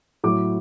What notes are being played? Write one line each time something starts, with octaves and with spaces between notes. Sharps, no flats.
A2 F#3 D6